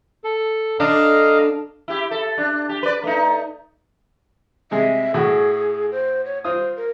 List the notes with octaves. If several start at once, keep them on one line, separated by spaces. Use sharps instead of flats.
A4
D3 D4 D#5 F5 A#5
E4 G4
A4
D4
G4
B4 D5
A3 D#4
C3 G#3 G#4 E5
A2 F#4 G#4
C5
C#5
F4 C5 D#6
A#4